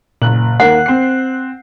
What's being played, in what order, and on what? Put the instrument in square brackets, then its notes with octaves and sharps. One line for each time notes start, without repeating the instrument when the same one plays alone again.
[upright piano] F#1 F#6 F#7 [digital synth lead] A#2
[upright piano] D#2 D#3 A#3 [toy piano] F#5 [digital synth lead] F#6
[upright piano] C4 C7